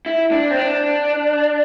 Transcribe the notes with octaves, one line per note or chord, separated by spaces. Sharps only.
E4
D4
C4
D4